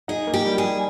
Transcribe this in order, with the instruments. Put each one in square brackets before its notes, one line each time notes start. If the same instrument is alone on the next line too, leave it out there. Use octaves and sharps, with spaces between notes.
[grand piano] D#4 [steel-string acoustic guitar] G#4
[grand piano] A#3
[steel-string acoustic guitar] G4
[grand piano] G3
[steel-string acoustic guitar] G#4
[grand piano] G3